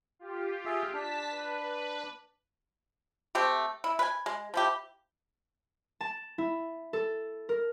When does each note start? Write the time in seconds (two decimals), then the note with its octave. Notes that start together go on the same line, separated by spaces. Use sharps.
0.19 F4 G4
0.65 G#4 E5
0.94 D4 A5 B6
1.31 B4
3.35 A3 C4 G4
3.84 E4
3.99 B4 G#5
4.26 G#3
4.54 F3 E4 G4
6.01 A5
6.38 E4
6.93 A4
7.49 A#4